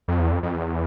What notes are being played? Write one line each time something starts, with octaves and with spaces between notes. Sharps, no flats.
F2
E2
F2
F2
E2